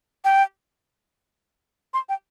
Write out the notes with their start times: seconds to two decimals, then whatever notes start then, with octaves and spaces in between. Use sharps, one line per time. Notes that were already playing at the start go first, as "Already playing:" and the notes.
0.24 G5
1.94 C6
2.09 G5